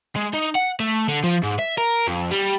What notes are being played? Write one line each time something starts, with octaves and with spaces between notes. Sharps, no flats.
G#3
D#4
F#5
A3
D3
F3
G#2
E5
A#4
F2
G3